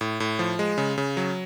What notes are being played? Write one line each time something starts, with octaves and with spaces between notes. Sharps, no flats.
A2
A2
F3
G#3
C#3
C#3
F#3